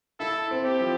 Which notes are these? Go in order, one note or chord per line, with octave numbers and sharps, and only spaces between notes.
E4 A4
C4
G4
F3